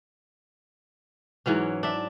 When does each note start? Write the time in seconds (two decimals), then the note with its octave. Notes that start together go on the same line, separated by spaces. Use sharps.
1.46 G#2 E3 F#3 C#4
1.83 D4 E5